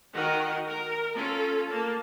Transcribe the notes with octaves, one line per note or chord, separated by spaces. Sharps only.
D#3 F#4 A#4 D#5 F#5
A#4
C#4 F4 A4
A#3 A5